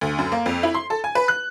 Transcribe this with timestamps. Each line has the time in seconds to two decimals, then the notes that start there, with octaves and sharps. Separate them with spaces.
0.01 D2
0.18 F#2
0.32 A#3
0.46 F2
0.63 E4
0.75 C6
0.90 A4
1.04 G#5
1.15 B4
1.28 F#6